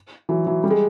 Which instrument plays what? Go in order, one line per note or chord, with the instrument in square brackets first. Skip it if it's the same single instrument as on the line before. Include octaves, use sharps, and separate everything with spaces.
[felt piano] E3 F#3
E3 F#3
G3
G#3